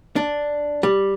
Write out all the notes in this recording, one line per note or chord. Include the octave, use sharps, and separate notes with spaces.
D4
G3